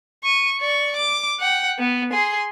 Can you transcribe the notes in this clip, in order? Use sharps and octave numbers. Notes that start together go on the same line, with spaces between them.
C#6 D#7
D5 C#6
D6
F#5 G5
B3
G#4 C6